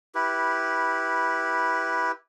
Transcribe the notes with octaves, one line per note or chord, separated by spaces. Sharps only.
E4 G4 B4